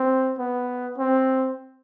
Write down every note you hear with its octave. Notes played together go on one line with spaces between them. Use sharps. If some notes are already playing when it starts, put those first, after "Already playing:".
Already playing: C4
B3
C4